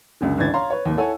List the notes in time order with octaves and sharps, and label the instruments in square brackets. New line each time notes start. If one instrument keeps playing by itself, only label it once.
[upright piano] C#2 F#2 D3
G1 C#2 E3 D4 G#6 A6
C#5 F5 A#5 C6
B4 C#5
G#1 D#2
E4 A4 C#5 F#5 G#5